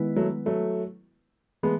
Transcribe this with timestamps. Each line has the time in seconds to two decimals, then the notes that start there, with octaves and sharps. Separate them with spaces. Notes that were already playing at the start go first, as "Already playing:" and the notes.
Already playing: D#3 G#3 B3 E4 B4
0.16 F#3 A3
0.46 F#3 A3
1.63 E3 G#3 A3 B3